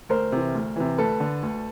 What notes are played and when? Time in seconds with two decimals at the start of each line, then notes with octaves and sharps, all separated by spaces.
0.09 D2 A#4 C5
0.32 C3 E3
0.54 D2
0.76 C3 E3
0.98 D2 A4 B4
1.20 D3
1.43 D2